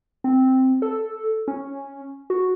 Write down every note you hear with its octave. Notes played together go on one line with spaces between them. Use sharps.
C4
A4
C#4
F#4